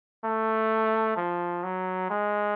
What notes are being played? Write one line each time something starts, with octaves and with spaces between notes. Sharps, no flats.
A3
F3
F#3
G#3